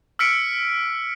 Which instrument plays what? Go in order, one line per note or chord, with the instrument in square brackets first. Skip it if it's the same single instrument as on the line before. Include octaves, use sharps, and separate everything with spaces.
[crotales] E6 F6 B6 C#7 D7